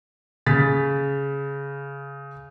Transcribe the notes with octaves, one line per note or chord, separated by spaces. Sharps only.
C#3 A6 B6